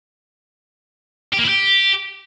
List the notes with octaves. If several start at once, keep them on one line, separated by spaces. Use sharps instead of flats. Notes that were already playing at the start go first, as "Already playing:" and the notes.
G4
A#3
E4
G4